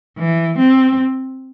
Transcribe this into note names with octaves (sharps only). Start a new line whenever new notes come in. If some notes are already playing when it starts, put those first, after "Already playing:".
E3
C4